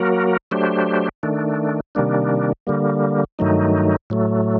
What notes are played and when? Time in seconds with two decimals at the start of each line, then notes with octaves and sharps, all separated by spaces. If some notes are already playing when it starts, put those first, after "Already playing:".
Already playing: F#3 A#3 F#4 A#4
0.51 F#3 A3 D4 G4 C5
1.23 D#3 A3 D4
1.95 C3 D#3 G3 A#3 D4
2.67 D3 G3 A#3
3.39 G2 D#3 F#3 A3 D#4
4.10 A2 F#3 A3